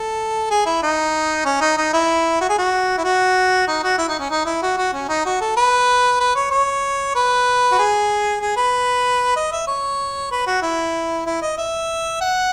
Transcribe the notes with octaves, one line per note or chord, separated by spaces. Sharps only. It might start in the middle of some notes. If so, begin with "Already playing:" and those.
Already playing: A4
G#4
E4
D#4
C#4
D#4
D#4
E4
F#4
G#4
F#4
E4
F#4
D#4
F#4
E4
D#4
C#4
D#4
E4
F#4
F#4
C#4
D#4
F#4
A4
B4
B4
C#5
C#5
B4
F#4
G#4
G#4
B4
D#5
E5
C#5
B4
F#4
E4
E4
D#5
E5
F#5